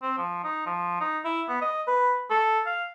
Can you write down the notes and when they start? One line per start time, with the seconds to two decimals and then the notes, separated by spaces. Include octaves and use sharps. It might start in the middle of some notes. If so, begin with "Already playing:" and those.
0.02 C4
0.18 F3
0.44 D#4
0.66 F3
1.00 D#4
1.25 E4
1.49 B3
1.62 D#5
1.87 B4
2.30 A4
2.66 F5